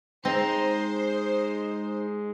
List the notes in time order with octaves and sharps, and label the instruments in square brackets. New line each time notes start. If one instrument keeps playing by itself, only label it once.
[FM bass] G#3 [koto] C4 [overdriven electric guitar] D#4 [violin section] C5